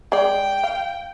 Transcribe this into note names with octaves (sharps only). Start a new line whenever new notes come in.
G#3 D5 G5
F5